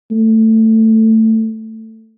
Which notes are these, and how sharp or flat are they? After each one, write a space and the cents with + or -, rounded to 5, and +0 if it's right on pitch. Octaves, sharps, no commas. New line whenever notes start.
A3 +15